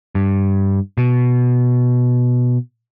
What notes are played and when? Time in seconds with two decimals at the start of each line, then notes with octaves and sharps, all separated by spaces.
0.15 G2
0.98 B2